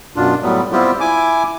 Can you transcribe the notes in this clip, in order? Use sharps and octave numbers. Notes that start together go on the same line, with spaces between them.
F#2 B2 D4 F4
A2 F#3 G3 B3
G3 B3 C4 E4 F4 G4
E4 G#5 D6